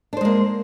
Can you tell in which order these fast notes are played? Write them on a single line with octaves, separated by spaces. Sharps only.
D4 C5 G#3 A#3